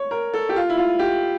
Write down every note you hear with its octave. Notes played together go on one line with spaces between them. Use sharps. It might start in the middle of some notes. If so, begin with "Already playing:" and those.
Already playing: C#5
A#4
A4
G4
F4
E4
F4
G4